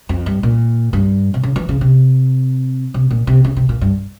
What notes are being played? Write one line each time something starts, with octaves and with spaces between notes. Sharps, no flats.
F2
G2
A#2
G2
C3
C#3
E3
C#3
C3
C3
A#2
C3
C#3
C3
A#2
G2